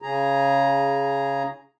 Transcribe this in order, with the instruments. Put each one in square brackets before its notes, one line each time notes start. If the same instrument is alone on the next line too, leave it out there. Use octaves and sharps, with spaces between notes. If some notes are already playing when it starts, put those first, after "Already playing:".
[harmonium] C#3 G#4 A#5